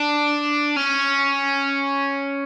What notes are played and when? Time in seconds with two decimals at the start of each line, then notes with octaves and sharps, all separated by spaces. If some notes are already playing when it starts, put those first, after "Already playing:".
Already playing: D4
0.77 C#4